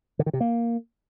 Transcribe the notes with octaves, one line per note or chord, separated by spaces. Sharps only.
D3
D#3
C3
A#3